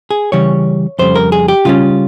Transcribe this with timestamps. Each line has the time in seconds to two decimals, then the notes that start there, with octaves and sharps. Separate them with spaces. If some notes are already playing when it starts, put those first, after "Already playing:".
0.11 G#4
0.32 C#3 E3 G3 C#4 C#5
0.99 F2 C#3 G3 C5
1.16 A#4
1.32 G#4
1.48 G4
1.65 C#3 G3 C#4 F4